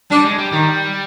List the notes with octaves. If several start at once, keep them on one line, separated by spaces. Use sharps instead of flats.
G3 D4
G#3
G3
D#3 G3